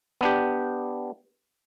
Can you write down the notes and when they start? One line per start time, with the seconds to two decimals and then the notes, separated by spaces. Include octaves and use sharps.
0.21 B3 D4 G4